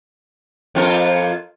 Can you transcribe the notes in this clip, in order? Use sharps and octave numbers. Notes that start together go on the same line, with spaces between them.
F2 F4 A#4